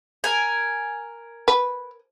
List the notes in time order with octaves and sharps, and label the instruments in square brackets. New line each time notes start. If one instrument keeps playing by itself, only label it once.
[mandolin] A#4 G#5
[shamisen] B4